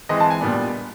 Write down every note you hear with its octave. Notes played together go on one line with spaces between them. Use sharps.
E3 G#3 C4 D#5
A5
G#5
A#2 G3 B3 D4